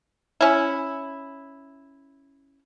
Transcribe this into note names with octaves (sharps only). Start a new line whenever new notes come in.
C#4 E4